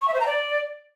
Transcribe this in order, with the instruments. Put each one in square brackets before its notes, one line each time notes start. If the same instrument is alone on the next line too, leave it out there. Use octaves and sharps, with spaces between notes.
[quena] C#6
E5
C5
A#5
D5